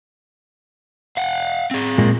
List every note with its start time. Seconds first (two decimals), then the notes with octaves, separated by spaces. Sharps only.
1.17 F5 F#5
1.71 C4 G#4
1.98 A#2 G#3 A#3